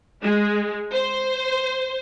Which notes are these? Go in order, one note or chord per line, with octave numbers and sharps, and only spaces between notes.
G#3
C5